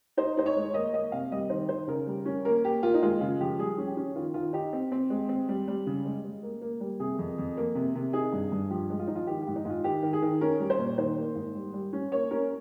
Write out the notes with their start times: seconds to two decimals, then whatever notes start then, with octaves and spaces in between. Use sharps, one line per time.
0.17 D#4 C5
0.37 D#4 C5
0.46 C#5
0.56 G#3
0.74 A#3 D#5
0.93 A#3 D#5
1.12 C3 F5
1.32 G3 D#5
1.50 D#3 C5
1.69 D#3 C5
1.88 C#3 A#4
2.07 G3
2.26 C#4
2.45 A#3 A#4
2.64 A#3 G4
2.82 A#3 F4
2.94 D#4
3.02 G#3 F4
3.21 C#3 F4
3.40 F3 G4
3.59 G3 G#4
3.78 C#4
3.87 G4
3.97 C#4
4.15 D#3 F4
4.34 D#3 F4
4.53 D#4 G4
4.73 C4
4.92 C4
5.10 G#3
5.29 C4
5.49 G3
5.68 G3
5.86 C#3
6.05 G#3
6.24 G#3
6.43 A#3
6.61 A#3
6.80 G3
7.00 C3 G#4
7.18 F2
7.38 F2
7.57 A#3
7.75 C3
7.95 C3
8.13 D#4 G#4
8.33 G2
8.52 G2
8.70 F3 G4
8.90 G#3
8.99 F4
9.07 F3 D#4
9.15 F4
9.27 D#3 G4
9.42 G4
9.47 G#2
9.56 D#4
9.65 G#2 F4
9.84 D#3 G4
10.03 D#3
10.13 G#4
10.22 D#3
10.41 C#4 A#4
10.60 G3
10.70 C5
10.78 A#2
10.98 D#3 C5
11.17 A#3
11.35 G#2
11.55 G3
11.73 G3
11.93 C#4
12.12 A#3 C#5
12.31 C#4 A#4